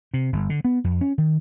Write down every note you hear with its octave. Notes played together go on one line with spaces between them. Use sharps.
C3
G1
D3
B3
F2
C#4
D#3